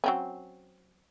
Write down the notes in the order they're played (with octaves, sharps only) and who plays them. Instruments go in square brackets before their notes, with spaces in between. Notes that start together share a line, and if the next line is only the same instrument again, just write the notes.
[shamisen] F#3 C4 C#4